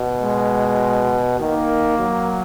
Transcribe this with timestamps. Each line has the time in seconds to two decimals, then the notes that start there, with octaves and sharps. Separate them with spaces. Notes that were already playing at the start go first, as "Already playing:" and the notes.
Already playing: B2
0.21 G#3
1.40 D#3 A#3
1.99 F#3